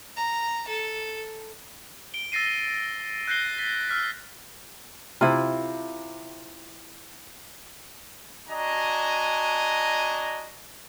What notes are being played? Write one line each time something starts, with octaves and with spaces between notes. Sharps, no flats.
A#5
A4
D7 G7
E6 A6 A#6 C7 D#7
F#6 G6 A#6 C7 G7
A6 B6
E6 F6 B6
C3 E4 F4
D4 F#4 D#5 G#5 A#5